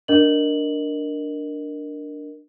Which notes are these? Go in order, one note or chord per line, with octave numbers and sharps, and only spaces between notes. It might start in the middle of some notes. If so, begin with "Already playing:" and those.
D4 A#4 D#5 F#7